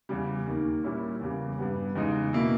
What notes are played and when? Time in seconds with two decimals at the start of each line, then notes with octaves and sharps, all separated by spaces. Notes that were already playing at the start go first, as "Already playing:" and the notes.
0.09 E2 C#3 G3
0.47 D#2 D#3 A#3
0.84 A#2 G3 C#4 E4
1.21 E2 C#3 G3
1.58 G2 G3 B3
1.95 E2 C#3 G#3 D#4
2.33 B2 A#3 E4